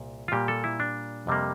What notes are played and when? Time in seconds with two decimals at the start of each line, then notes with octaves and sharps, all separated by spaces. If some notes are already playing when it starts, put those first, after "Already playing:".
Already playing: C2 A#2
0.28 F4
0.32 A#2 G3 A#3 G4
0.48 A4
0.64 E4
0.80 D4
1.27 F2 C3 G3 A#3